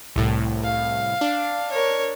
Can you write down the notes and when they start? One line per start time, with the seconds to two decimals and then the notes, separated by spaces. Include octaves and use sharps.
0.16 C2 A2
0.63 F5
1.21 D4
1.71 A#4 C#5